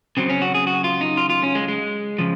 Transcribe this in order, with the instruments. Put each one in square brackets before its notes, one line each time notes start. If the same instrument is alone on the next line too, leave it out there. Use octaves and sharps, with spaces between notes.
[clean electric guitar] C#3 F#3 C4
C#4
F#4
G#4
F#4
F4
D#4
F4
F4
C#4
G#3
G#3
C#3 F3